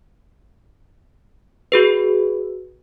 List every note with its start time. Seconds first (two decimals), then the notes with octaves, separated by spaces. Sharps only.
1.72 F#4 G#4 B4